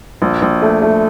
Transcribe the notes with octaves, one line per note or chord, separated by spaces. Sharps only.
A#1
A#1
A3
A3